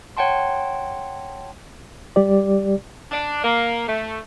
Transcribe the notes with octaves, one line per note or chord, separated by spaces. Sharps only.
C#5 F#5 G5 A5 C6
G3 G4 D5
D4
A#3
A3